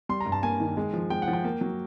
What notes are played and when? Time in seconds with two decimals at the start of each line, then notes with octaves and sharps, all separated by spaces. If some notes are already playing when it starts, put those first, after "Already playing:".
0.09 G3 C6
0.21 A#5
0.26 G2
0.32 A5
0.43 A#3 G#5
0.60 D#3
0.77 G#3
0.93 F3
1.10 G#3 G5
1.22 F#5
1.28 F3
1.33 G5
1.44 A#3
1.61 F#3